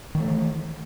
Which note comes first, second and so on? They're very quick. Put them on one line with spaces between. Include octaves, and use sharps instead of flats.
D#3 E3 A3